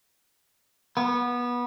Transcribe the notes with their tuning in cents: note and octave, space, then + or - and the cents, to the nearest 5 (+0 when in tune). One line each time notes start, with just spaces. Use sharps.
B3 -20